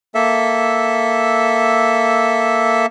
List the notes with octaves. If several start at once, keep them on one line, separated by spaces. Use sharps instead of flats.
A#3 A4 E5